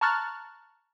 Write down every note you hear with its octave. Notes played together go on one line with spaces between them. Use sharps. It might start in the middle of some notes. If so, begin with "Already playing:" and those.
A5 A#5 C#6 F6 F#6 A6